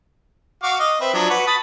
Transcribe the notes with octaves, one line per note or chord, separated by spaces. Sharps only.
F#4 F5 D6
D#5
C4 B4 E5
F3 F#3 D4
F#4 B4
A5 B5 D#6